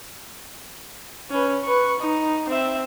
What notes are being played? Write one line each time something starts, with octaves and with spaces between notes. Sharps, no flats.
C#4 B4
B4 C#6
D#4
C4 E5